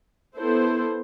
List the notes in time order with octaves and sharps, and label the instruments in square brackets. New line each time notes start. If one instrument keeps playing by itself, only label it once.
[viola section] B3 E4 A4 C5